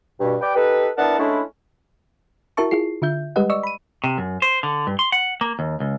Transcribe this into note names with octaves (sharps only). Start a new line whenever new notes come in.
G2 B2
G4 B4 D5 G5
D#4 G4 A4 B4
B3 D4 E4 A#4 F#5 A5
G#3 A3 C#4 D4 E4
E4 F#4 A#4 E5 A5 C#6
E4 F4 G#4 C7
D3 F4 E5 G6
G3 G#3 G4 B4 D#5 F#5
D5 D#5 C#6 E6
B5 D#7
C3
F#2
C5
D3
G2
C6
F#5
A#3
D#2
C#2